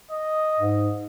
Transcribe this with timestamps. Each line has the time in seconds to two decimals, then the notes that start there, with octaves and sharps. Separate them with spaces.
0.11 D#5
0.59 G#2